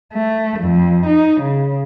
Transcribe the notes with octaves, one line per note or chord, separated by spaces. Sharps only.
A3
F2
D#4
C#3